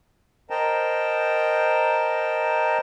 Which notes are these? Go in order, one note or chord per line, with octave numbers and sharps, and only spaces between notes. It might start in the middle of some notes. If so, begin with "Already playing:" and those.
A#4 C5 D#5 G5 A5 A#5